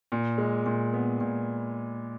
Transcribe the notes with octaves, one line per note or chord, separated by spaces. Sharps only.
A#2
G#3
A#2
B3
A#2